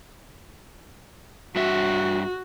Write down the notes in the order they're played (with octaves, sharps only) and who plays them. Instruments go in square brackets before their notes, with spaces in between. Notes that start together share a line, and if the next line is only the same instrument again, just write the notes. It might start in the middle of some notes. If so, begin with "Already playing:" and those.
[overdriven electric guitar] G2 E5 [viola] F#4